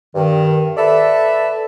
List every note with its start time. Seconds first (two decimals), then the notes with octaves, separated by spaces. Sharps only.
0.15 G2 D#3
0.77 A4 B4 D5 E5